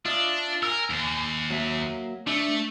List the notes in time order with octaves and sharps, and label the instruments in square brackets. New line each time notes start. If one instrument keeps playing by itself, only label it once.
[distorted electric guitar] D4 [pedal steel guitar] F4 D#5 E5
[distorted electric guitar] A#4 [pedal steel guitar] G#5 E6
[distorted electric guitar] D#2
[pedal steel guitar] F#3 A#3 E5
[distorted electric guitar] A3 [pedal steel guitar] D4 E5